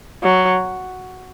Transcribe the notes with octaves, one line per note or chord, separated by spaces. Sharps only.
F#3